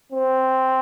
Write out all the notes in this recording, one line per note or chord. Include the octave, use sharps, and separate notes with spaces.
C4